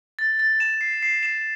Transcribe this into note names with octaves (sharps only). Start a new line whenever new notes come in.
A6
A6
E7
C7
C7
E7